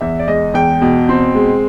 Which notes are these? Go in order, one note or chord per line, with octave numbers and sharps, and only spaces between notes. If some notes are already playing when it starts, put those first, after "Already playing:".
E2 E5
D5
G#3 D#5
E2 G5
B2
C4
G#3